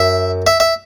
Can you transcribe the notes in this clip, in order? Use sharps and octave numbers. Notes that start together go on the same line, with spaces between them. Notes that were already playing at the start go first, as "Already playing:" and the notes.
Already playing: F#2 E5
E5
E5